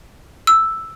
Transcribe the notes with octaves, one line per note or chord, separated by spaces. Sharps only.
E6